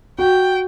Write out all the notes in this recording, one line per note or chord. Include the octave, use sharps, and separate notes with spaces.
F#4 G5